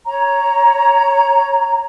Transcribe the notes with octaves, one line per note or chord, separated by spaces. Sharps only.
C#5 A#5